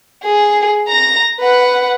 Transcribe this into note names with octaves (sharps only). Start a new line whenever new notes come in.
G#4
A#5 A#6
B4 F#5